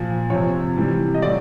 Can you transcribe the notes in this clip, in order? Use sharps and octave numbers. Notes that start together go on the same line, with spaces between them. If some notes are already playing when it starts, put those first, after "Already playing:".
Already playing: A#2 F3
C3 F3 C#5
C3 E3 G3
D#5
A2 F#3 D5